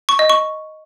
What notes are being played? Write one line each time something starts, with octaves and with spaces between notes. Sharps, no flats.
C#6
D#5
C#6